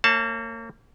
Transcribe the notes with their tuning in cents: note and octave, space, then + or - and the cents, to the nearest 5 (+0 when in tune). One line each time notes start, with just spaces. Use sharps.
A#3 -35 C#5 -15 A5 +0